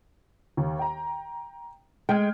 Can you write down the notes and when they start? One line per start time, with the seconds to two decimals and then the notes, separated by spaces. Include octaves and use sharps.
0.57 D#2
0.79 G5 A#5
2.09 G#3 G5 F6 G#6